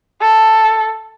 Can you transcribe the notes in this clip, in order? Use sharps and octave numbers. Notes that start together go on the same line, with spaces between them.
A4